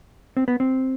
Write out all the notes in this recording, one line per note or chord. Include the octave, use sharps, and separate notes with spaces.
C4
B3
C4